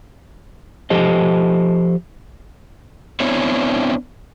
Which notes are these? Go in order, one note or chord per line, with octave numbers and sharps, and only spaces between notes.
F3 G4 A4 C5 D#5
B3 C4 D4 E4 C#5